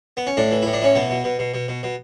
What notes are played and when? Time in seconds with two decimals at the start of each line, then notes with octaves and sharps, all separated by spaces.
0.17 B3
0.27 C#4
0.37 A2 D4
0.51 E3
0.62 A2 E4
0.73 D4
0.81 E3 C#4
0.95 B2 B3
1.10 B2
1.24 B2
1.39 B2
1.54 B2
1.68 B2
1.83 B2